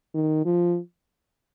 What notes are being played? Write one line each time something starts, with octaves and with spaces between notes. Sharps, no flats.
D#3
F3